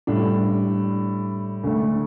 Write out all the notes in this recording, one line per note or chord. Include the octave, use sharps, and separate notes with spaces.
A2 G3 D4
D2 D3 A3